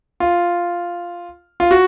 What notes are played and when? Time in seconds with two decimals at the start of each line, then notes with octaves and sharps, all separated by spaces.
0.20 F4
1.60 F4
1.71 F#4